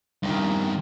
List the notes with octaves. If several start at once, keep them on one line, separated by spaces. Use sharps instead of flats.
G2 D#3